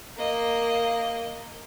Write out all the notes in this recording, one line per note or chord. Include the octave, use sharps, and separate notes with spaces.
A#3 D#5